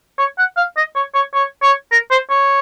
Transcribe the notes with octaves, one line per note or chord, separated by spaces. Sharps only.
C#5
F#5
F5
D#5
C#5
C#5
C#5
C#5
A#4
C5
C#5